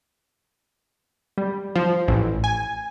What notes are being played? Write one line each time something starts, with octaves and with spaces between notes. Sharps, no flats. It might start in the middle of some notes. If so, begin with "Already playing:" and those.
G3
F3
A1
G#5